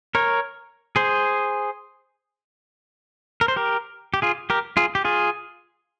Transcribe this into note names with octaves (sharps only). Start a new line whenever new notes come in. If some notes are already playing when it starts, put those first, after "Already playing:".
A#4 C#5
G#4 C5
A#4
C5
G4 A#4
G4
F4 G#4
G4 A#4
F4 G#4
G4
F4 G#4